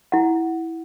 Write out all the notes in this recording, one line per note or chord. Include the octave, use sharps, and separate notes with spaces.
E4 F#5